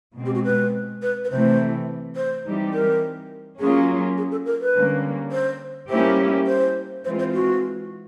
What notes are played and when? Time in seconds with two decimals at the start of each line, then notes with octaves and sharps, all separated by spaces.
0.16 B2 G#3 C4
0.26 G4
0.35 F#4
0.45 B4
1.02 B4
1.25 B4
1.30 C3 E3 A3 C5
2.16 C5
2.45 E3 G3 C4 D#4 G4
2.74 A#4
3.60 F#3 A#3 C#4 F4 G#4
4.17 G#4
4.31 A4
4.46 A#4
4.61 B4
4.75 D3 G3 A#3 C#4
5.32 C5
5.90 G3 A#3 C#4 E4 G4 C5
6.47 C5
7.04 E3 G#3 C4 F4 C5
7.19 C5
7.34 F#4